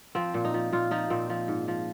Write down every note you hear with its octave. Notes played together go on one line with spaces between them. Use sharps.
F3 C4
A#2
D#4
F3
A#2 F4
F3 D#4
A#2 C4
F3
G#2
F3